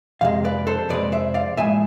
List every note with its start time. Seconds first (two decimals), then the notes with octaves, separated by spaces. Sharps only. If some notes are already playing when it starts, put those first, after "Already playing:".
0.21 F2 C3 G#3 F5
0.45 B4 D5
0.67 A4 C5
0.89 F2 C3 G#3 B4 D5
1.12 C5 E5
1.34 D5 F5
1.57 A2 F3 G#3 E5 G#5